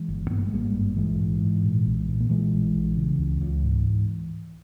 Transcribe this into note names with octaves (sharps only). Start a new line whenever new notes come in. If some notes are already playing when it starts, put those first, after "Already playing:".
Already playing: E3 G#3
G1
G2 B3
A#3
G#3
G#1 G3 A#3
G2
A#1 E3 G#3
G#2
G#2
A#2
B1
A#2
A#3
A#2 E3 G#3
A#1
A#1
C#3
C#2
C#2
G#2